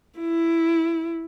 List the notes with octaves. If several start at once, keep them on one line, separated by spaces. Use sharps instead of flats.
E4